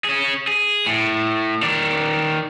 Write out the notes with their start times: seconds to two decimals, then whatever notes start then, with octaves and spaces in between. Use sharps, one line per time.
0.04 C#4 G#4
0.48 G#4
0.87 A2
1.63 D#3 D5